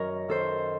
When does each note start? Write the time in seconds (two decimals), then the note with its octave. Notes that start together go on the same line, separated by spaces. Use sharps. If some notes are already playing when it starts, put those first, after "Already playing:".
Already playing: F#2 D#3 A#4 C#5 D#5
0.28 D#3 A4 C5